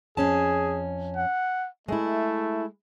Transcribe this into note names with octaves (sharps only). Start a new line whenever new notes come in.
F2 C#4 G#4 A5
F#5
G#3 A3 E4